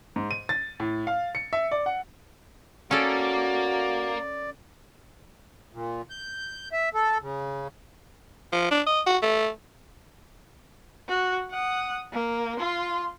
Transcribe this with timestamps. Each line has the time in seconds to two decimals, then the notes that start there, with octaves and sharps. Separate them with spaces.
0.16 G#2
0.31 D#7
0.49 A6
0.80 A2
1.07 F5
1.35 C#7
1.53 E5
1.72 D5
1.86 F#5
2.91 A#3 C#4 F#4 A4 D5
5.73 A#2
6.10 G6
6.72 E5
6.94 A4
7.22 C#3
8.52 F3
8.71 D4
8.87 D#5
9.06 F#4
9.22 A3
11.09 F#4
11.51 F#5 D#6
12.13 A#3
12.58 F4 C6